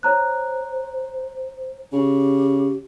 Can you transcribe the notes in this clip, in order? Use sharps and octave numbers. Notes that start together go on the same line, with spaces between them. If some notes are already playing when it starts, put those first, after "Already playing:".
C5 C#5 A#5 F#6
C#3 G4